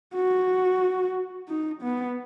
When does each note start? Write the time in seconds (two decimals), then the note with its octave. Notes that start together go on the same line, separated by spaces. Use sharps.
0.15 F#4
1.49 D#4
1.81 B3